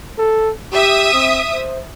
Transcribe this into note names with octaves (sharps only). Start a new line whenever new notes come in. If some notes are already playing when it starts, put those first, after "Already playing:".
A4
G4 E5 D#6
C4
C5